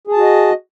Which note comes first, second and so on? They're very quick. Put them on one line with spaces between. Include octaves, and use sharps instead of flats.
G#4 A5 F#4 D#5